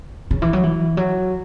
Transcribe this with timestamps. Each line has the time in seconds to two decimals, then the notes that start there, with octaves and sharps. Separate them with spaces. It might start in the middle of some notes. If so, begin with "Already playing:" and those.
0.31 C#3
0.42 E3
0.53 F#3
0.64 E3
0.97 F#3